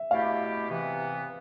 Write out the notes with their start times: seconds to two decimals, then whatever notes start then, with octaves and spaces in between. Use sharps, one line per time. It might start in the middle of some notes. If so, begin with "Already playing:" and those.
Already playing: E5
0.10 B2 A3 E4 G4 F5
0.70 C3 E3 B3